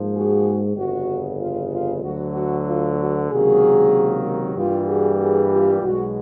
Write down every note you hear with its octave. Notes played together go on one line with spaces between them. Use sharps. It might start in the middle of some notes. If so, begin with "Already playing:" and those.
Already playing: G#2 F3 A#3
F#4 G#4
G1 F2 C#3 F#4
F4
F4
D2 D3 F#3 F#4
F#4
F4
F#4
C#2 C3 D#3 F#3 A#3 F#4 G#4
G2 E3 G3 A#3 F4 G4
F#4 G#4
F#4 G#4
F4 G4
B1 B2 G#3 F#4